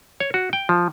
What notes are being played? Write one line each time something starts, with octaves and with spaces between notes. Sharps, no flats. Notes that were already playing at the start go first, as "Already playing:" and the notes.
C#5
F#4
G5
F3